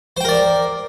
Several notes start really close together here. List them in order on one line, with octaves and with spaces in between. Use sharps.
C5 G5 A#4 D5